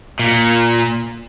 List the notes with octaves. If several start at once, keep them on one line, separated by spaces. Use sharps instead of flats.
A#2